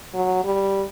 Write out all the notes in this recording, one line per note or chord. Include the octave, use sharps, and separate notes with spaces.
F#3
G3